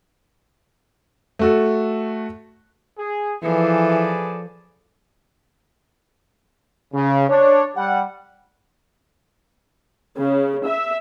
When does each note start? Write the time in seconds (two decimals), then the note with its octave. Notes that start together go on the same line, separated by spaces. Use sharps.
1.39 A3 F#4 A4
2.98 G#4
3.43 E3 F3 G#4 A4 B4 D5
6.94 C#3
7.29 D4 C#5
7.76 G3 F#5
10.19 C#3
10.68 E5